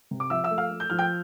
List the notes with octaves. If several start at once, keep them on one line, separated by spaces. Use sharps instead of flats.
C3
D6
F3 E5 E6
E5 E6
A3
F5 F6
A3
G6
F3 F6
G5 G6